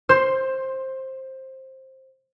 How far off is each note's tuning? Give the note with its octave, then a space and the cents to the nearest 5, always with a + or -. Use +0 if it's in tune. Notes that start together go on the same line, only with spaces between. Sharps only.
C5 +15 C6 +0